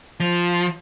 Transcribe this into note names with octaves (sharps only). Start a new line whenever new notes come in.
F3